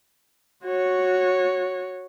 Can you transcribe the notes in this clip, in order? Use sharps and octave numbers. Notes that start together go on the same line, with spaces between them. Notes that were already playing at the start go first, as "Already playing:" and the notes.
F#4 C#5